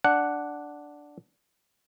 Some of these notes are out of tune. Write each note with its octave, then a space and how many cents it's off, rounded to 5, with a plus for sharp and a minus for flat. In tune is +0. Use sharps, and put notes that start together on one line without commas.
D4 -5 F#5 +0